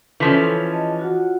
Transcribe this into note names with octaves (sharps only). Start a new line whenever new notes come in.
E3 F3 C#4 A4 C5
G#4 D#5 A5
F4 F#4 F#5